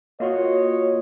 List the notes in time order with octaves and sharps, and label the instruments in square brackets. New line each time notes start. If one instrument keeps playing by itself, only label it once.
[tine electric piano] A#3 F4 F#4 [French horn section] C#5 D#5